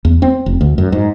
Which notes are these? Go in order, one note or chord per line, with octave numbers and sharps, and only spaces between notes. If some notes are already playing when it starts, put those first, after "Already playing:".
E2
C4
F1
D2
F#2
G#2